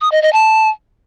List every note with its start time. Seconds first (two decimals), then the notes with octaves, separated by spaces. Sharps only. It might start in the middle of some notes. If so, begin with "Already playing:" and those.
0.01 D#6
0.12 D#5
0.22 D#5
0.33 A5